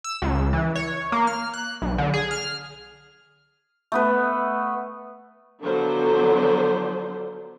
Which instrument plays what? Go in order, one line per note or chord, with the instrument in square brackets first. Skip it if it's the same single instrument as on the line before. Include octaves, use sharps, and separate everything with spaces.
[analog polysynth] E6
C#2
E3
C#5
A#3
F6
F#6
B1
D3
G#4
F6
[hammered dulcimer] A3 B3 B4
[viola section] D3 F3 F#3 B3 A4 C5